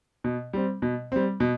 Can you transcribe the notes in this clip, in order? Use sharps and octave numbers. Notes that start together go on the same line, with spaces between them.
B2
G3 C4
B2
G3 C4
B2